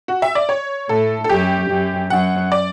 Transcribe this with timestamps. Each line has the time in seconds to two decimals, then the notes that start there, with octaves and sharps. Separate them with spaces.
0.08 F#4
0.22 E5
0.35 D5
0.49 C#5
0.89 A2 A4
1.24 A4
1.29 F#2 G4
1.70 F#2
2.10 F#2 F#5
2.52 D5